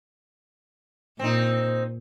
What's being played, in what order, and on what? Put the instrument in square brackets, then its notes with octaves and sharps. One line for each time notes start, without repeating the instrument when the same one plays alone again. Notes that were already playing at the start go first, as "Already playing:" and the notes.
[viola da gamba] A#2 [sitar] C4 D#4